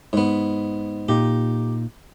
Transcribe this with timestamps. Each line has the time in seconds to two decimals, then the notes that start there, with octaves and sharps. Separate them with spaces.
0.13 G#2 B3
1.09 A#2 D#4 G4